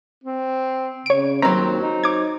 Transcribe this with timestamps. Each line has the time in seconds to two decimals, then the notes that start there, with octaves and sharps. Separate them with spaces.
0.24 C4
1.06 C#3 C#5 D7
1.42 D#2 F#3 C4 A#5
1.82 D#4
2.04 D6 G#6